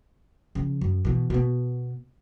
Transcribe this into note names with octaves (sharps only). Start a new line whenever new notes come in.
C#3 F3
F#2
B2 E3
B2 B3